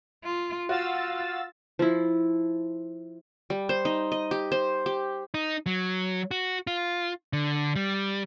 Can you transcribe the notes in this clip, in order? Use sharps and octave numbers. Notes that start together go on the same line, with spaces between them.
F4
F4 F#4 F5 E6 A6
F3 E4
G3
C5
D#4
D#5
G4
C5
G4
D#4
F#3
F#4
F4
D3
G3